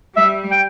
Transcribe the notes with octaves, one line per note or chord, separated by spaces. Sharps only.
G3 E5
G5